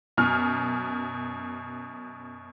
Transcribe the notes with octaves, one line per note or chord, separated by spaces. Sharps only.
F#2 B2 F6